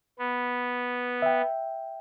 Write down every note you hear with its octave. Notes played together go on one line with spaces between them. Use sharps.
B3
E5 G5